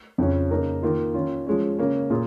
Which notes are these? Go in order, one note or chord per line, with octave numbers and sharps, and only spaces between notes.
F2 C#3 F3 C#4
C#3 A#3 D#4 A#4 C#5
D#3 A#3 F4
D#3 C#4 F4
F3 G#3 C#4
C#3 A#3 C#4
A#2 A#3 F4 G#4